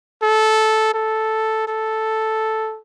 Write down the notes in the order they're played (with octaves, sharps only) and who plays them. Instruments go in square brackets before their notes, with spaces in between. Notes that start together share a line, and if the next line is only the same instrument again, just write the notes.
[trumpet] A4
A4
A4